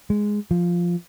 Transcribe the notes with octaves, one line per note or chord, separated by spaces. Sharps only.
G#3
F3